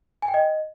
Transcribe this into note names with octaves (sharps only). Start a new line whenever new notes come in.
G#5
G5
D#5